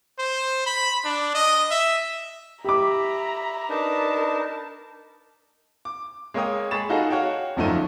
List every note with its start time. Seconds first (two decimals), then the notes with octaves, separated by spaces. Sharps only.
0.19 C5
0.66 B5
1.05 D4
1.35 D#5
1.71 E5
2.64 G4 E5 A#5 B5 D6
3.69 D4 D#4 A#4 B4 A5
5.85 D6
6.34 G#3 A#3 C#5 D#5 G5 D#6
6.71 G#3 G#4 B5 C#6 A6 E7
6.89 D#4 F4 F#4 G#4 A4 D#5
7.10 F#4 C#5 F5 G5
7.56 G1 F#2 F3 A3 D#4 D#7